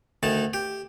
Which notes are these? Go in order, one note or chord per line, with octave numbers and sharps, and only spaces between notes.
D2 D#3 A5
G4